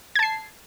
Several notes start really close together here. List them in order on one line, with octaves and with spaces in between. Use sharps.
G#6 A5 C7